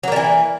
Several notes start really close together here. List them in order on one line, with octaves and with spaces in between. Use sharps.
F#3 A#3 G3 E3